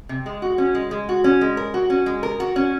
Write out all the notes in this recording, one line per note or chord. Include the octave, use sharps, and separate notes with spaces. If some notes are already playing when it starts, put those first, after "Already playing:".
C3
G#3
F#4
C#4
G#3
G#3
F#4
C#4
G#3
A#4
F#4
C#4
G#3
A#4
F#4
C#4